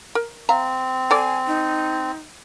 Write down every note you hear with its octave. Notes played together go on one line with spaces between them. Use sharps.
A#4
C4 E5 F5 A#5
A4 D5 G#5
D#4